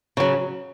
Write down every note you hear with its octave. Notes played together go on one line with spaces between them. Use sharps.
C#3 F#3